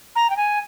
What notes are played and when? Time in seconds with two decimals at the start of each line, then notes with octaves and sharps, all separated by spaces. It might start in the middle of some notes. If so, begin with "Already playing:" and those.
0.15 A#5
0.30 G5
0.36 G#5